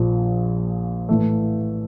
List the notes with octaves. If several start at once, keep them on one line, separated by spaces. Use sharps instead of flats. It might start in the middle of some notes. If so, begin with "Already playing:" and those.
Already playing: A#1 A#2 F3
A2 E3 A3